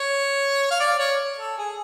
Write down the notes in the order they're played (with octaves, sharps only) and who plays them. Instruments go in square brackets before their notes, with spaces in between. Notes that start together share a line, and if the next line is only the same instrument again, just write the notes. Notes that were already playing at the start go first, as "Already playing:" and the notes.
Already playing: [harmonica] C#5
F5
D5
C#5
A4
G#4